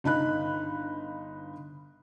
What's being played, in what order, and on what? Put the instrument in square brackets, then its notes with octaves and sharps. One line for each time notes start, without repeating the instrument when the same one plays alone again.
[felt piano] G1 D#4 B5 F#6